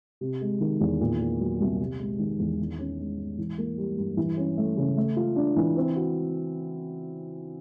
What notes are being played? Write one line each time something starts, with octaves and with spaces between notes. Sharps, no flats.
C3
G#3
D#3
E2
A#2
A#3
F#3
C2
C3
G#3
D#3
E2
D#3
C#4
G#3
G#2
E3
A#3
G3
G2
E3
C#4
A3
C#3
A3
F4
D4
E3
C4
F#4